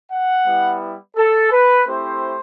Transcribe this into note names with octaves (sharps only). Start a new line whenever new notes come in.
F#5
G3 B3 E4
A4
B4
A3 C4 E4 G4 C5